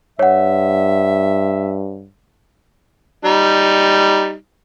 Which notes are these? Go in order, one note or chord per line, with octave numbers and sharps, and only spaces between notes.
G2 C#5 E5 F#5
G3 D#4